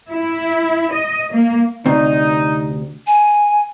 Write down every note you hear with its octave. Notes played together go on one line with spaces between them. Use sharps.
E4
D#5
A#3
D2 C3 D#4
G#5